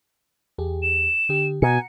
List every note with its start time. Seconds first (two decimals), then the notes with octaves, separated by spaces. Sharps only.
0.58 E2 G4 G#4
0.83 E7
1.29 D3 G4
1.62 B2 F#5 G#5 A#5 C#7